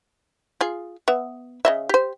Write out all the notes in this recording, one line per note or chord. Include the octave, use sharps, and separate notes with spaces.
F4 G#4
B3 E5
C#3 D#5 E5
G4 C5